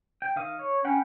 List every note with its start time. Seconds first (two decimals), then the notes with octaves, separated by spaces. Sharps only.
0.22 G5
0.36 D#3 F5 D#6
0.59 C#5
0.85 C#4 F#5 G5 B5